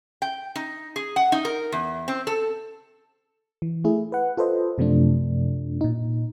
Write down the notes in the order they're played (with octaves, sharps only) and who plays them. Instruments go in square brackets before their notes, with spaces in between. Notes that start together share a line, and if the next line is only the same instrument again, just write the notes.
[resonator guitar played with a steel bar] G5
D#4
G#4
F#5
D#4
A#4
E2
C4
A4
[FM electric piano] E3
A3 E4 G#4
B4 F#5
F4 A4 B4 C5 D#5
F#2 C3 F3 A3 D4
A#2 D#4